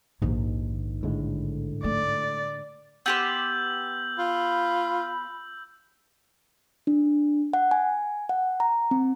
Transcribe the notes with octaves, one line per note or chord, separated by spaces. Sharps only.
A#1 D#2 G#2 D#3
A2 D3 G#3
A3 D5
B3 G4 C5 E6 G6 F#7
F4 B5
D4
F#5
G#5
F#5
A#5
C4